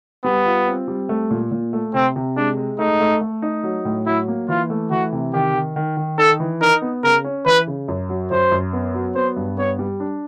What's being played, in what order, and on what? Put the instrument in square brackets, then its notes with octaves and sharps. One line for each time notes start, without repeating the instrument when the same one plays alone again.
[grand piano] G3 [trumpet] B3
[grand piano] F4
C4
G3
A3
A#2
A#2
A3
[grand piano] C3 [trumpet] C4
[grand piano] C3
[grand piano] G#3 [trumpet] D4
[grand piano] G#3
[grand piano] A3 [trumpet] D#4
[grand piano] A3
A3
D#4
F#3
A2
[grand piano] F#3 [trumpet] E4
[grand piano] A#3
[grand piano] E3 [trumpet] F4
[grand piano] A3
[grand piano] E3 [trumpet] F#4
[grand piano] C3
[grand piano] D#3 [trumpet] G4
[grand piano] D#3
D#3
D#3
[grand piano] D#4 [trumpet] A4
[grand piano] E3
[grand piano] D#4 [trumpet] A#4
[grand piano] B3
[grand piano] C#3 [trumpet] A#4
[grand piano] C#4
[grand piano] E3 [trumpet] B4
[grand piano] C#3
F#2
F#3
[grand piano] F#2 [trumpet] C5
[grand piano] F#2
B3
F#3
[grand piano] B3 [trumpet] C5
[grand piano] G2
[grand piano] B3 [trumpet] C#5
[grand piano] G3
D4